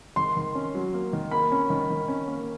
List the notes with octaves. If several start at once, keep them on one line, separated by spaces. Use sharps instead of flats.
D#3 C6
D#3
C#4
F#3
A#3
D#3
A#3 B5
C#4
D#3
D#3
C#4
A#3